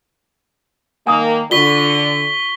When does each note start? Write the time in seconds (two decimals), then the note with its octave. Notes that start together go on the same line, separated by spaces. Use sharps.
1.07 D#3 A#3 G#5 D#6
1.51 D3 F4 C#6 B6 G7